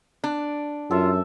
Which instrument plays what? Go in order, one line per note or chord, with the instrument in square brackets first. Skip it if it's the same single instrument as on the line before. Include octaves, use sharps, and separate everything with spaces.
[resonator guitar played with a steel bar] D4
[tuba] F#2 [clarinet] F4 [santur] A4 E5